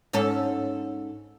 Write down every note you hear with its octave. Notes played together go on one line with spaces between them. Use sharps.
G#2 C#4 A4